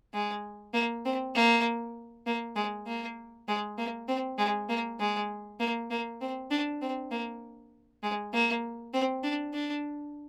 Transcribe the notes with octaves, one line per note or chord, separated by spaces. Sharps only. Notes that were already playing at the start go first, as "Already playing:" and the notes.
G#3
A#3
C4
A#3
A#3
G#3
A#3
G#3
A#3
C4
G#3
A#3
G#3
A#3
A#3
C4
D4
C4
A#3
G#3
A#3
C4
D4
D4